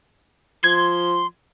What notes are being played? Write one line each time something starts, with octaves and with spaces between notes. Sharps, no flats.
F3 C6 G#6